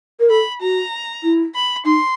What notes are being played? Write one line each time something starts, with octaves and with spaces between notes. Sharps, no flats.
A#4
A4 B5
F#4 A#5
E4
B5
D#4 C6